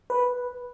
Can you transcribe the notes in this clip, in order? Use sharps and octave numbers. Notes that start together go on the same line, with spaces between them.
B4